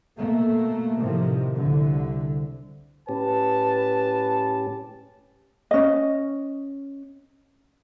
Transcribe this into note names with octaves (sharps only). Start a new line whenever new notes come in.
B2 A3 A#3
A2 C3 D#3 F3
C2 D3
A2 C#4 G4 B4 A5
C#4 D#5